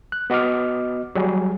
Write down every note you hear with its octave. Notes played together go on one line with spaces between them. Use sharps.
F#6
B3 F#4 D#5 D6 F6
F#3 G3 G#4